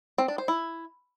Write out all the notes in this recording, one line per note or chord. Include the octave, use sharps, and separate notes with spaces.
C4
D4
C5
E4